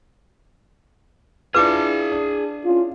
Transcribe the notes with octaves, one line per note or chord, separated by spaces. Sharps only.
D4 E4 F4 G#4 B4 A5 D6
D4
C#4 E4 F4